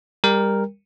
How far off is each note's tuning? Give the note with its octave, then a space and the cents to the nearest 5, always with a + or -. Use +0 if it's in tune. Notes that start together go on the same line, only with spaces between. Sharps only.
G3 +25 A#4 +0 G5 +20